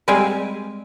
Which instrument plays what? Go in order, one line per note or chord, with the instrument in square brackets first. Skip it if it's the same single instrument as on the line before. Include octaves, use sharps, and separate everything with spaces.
[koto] G3 G#3 C4 F5 G5 G#5